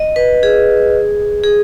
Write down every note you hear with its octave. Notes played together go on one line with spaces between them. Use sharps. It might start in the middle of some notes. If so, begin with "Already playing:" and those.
Already playing: D#5
B4
G#4
G#4